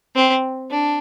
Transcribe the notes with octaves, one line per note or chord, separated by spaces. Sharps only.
C4
D4